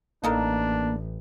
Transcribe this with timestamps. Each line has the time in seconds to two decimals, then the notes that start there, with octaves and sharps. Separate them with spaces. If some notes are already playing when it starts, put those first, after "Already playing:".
0.24 A1 A#3 D4 D#4 A4 A#4